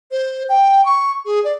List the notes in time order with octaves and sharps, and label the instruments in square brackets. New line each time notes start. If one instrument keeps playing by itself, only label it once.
[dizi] C5
G5
C#6
G#4
D5